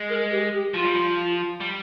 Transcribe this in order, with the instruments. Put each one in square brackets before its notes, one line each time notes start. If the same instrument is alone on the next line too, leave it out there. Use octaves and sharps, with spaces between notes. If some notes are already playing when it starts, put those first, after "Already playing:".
Already playing: [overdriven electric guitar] G#3
[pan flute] A#4
G4
G4
[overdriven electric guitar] F3 [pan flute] F4
[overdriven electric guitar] G3
F3
G3